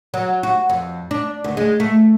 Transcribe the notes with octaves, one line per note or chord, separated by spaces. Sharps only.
F#3
F#4
F2
D4
D2
G#3
A3